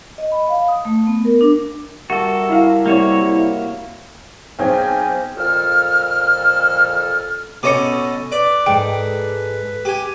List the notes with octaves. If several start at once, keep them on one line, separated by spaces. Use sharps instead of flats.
D#5
B5
F5
D#6
A3
B3
A#4
D4
G3 F#4 A4 A#4 E5
E4 F5
C2 A#3 F#4 C#5
B1 C4 G#4 G5 G#5
F2 A#2 A4 F6
B2 C#4 A4 D#5 D6 C#7
B4 D5
G#2 G#4 A4 G5
G4 G#5